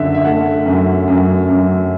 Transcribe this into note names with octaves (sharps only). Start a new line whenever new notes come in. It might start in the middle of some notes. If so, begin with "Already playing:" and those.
Already playing: F#2 D3 E5
E5
A3 F#5
F#2
F#2
F#2